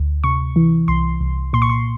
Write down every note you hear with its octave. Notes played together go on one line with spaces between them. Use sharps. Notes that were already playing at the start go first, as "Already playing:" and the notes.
Already playing: D2
C3 C#6
E3
C2 C6
C2
A#2 C6
C#6
C6